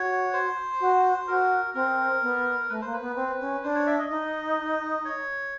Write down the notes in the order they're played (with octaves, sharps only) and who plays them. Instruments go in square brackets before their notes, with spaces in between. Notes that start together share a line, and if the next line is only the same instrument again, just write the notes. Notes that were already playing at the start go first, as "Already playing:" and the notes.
Already playing: [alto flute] F#4 [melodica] C#5
[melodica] C5
[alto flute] F#4
[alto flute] F#4 [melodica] A#4
[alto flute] C4 [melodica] A#4
[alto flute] B3
[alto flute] A3 [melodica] B4
[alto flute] A#3 [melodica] C5
[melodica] B4
[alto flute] B3
C4
C#4
[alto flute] D4 [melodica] C5
[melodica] C#5
E5
D#5
[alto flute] D#4 [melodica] D#5
[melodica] C#5